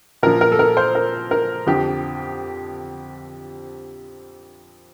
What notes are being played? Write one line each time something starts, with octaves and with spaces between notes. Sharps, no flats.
A#2 F3 A#4
A#4
A4
A#4
C5
A#4
A#4
F2 D3 F3 G4